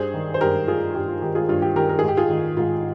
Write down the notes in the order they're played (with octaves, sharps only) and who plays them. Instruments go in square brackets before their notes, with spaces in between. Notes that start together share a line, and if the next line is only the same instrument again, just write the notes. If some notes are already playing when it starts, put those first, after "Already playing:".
Already playing: [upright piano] G2 G#4 C5
D#3
C5
G2 G4 A#4
D#3 F4 G#4
G2 G4
F4
D#3 G4
F4 G#4
G2 F4
G4
D#3 G4 A#4
A#4
G#4
G#2 G4
F4 G#4
D#3
G#2 F4